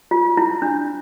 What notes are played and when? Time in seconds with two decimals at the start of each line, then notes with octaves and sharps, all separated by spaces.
0.11 F4
0.37 E4
0.62 D4